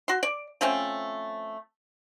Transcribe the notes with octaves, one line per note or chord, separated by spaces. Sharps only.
F#4 C6
D5
F3 A3 C4 C#4